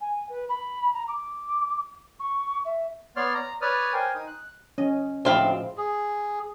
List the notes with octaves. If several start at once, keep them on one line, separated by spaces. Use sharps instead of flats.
G#5
B4
B5
A#5
D6
C#6
E5
B3 C#5 D5 C6 F6
A#5
B4 C#5 D5 D#6 F6
A#4 C5 G5 G#5
D#4 D#6
F#6
C#4 D#5
D2 A2 F3 G#3 C4 C5 F5 B5
G#4